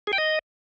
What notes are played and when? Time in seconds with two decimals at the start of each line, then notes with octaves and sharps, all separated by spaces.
0.07 G#4
0.13 G5
0.18 D#5